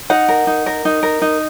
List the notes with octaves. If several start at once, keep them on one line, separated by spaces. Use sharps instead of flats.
D#4 F#5
A#4
D#4
A#4
D#4
A#4
D#4